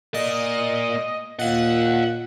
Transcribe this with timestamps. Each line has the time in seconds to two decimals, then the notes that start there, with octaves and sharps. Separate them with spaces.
0.14 A#3 D5 D#5
1.39 A#2 D#5 F5 F#5